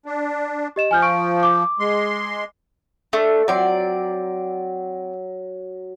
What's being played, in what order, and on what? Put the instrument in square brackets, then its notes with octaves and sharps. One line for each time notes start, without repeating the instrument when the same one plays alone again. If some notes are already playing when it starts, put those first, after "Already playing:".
[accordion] D4
[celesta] G4 D#5 E7
[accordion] F3 [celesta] G#5 F6 G6
[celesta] C#6 D7
D6
[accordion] G#3 C6
[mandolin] A3 D4
[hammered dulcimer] F#3 [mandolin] C4 D5